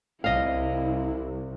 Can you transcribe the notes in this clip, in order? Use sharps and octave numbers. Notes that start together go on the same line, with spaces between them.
C2 C4 E4 D#5 F5